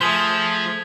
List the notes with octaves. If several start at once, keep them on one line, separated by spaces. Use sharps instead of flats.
F3 A3 G#4 C5 D#6 G#6 B6